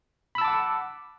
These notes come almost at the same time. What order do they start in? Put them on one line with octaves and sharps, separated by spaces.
B5 E6 A5 D6 F#5